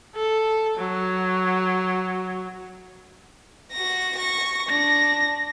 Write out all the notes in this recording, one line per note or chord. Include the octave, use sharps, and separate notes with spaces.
A4
F#3
F#4 A#6
C#6 A#6
D4 A#6